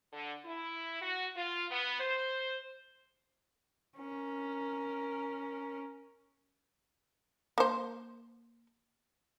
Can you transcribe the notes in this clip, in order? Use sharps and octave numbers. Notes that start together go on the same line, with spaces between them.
D3
E4
F#4
F4
B3
C5
C#4 A#4
A#3 C5